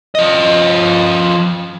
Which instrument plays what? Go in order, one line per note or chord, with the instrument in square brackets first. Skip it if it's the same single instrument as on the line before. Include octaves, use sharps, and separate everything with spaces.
[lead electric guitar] F3 D#5